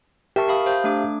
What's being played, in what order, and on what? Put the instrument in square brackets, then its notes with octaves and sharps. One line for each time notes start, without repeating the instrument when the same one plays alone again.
[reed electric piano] G4 E5 A5 [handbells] A#4 C#6
[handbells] F5 B5 D#6
C5 F5 G6
A3 D4 D6